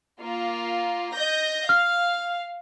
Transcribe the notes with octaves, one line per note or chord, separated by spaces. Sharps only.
A#3 F4
D#5 G6 A#6
F5 F6